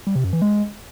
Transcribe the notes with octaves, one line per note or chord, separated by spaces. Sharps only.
G3
C3
F#2
E3
G#3